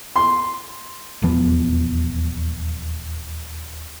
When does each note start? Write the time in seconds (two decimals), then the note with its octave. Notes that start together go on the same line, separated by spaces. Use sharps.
0.16 C6
1.22 D#1 E2 F3 B3